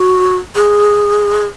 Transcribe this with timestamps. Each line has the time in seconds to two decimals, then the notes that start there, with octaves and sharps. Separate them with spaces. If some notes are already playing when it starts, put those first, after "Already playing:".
Already playing: F#4
0.55 G#4